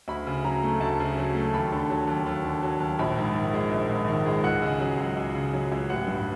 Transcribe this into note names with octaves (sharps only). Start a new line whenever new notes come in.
D2 B5
C#3
F#3 A#5
A3
D2 A5
C#3
F#3
A3
D#2 B5
D3
F#3
D#2
D#2
D3
F#3
D#2
A#1 B5
G#2
D#3
G#3
A#1
G#2
D#3
G#3
C#2 F#5
C#3
F#3
C#2
C#2
C#3
F#3
C#2
A1 F#5
G2